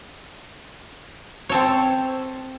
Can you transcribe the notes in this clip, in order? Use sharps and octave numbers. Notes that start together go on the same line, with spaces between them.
C4 A4 C#5